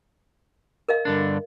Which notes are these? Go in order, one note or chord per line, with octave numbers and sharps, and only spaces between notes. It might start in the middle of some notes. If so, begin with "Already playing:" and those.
A#4 D#5 F5
G2 D3 D4